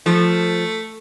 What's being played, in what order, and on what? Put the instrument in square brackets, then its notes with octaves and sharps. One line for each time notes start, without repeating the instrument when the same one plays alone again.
[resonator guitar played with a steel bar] F3 [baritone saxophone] A3